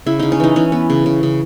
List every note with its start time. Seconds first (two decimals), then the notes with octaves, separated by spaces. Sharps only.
0.06 C#3 E4
0.19 C#3 D#4
0.32 C#4
0.40 E3 D#4
0.56 E3 C#4
0.72 B3
0.90 C#3
1.06 C#3
1.23 C#3